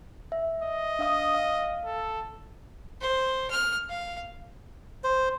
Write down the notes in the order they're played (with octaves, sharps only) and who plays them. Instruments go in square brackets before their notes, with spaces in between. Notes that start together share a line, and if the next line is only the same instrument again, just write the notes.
[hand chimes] E5
[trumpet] D#5
[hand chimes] D4 F5 D#6
F5
[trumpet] A4
[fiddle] C5
F6
F5
[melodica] C5